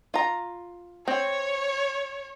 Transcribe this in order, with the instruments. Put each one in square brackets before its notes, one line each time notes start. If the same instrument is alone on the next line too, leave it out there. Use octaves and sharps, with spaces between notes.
[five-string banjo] F4 A#5
[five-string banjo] C4 [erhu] C#5